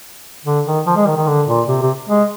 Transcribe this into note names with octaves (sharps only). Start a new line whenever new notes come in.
D3
D#3
F3
G#3
D#3
D#3
D3
A#2
C3
C3
G#3